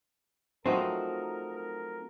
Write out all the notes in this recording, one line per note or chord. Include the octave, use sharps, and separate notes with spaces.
F3 F#3 A3 C4 D#4 A#4
A#4